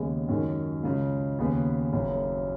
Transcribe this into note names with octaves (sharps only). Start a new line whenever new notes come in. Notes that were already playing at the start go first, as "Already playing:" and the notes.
Already playing: D#2 C#3 G#3 B3 G#4
F#2 D#3 G#3 C#4
C#2 C#3 G#3
D#2 C#3 B3 G#4 B4
F#1 F#2 C#3